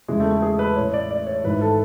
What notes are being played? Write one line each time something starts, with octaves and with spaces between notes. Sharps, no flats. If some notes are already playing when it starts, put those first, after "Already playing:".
E2 C#3 E3 G#3
A3
A3
G#4
B4
A1 A2 E3 C#5
D5
D5
C#5
G#1 G#2 E3 B4
A4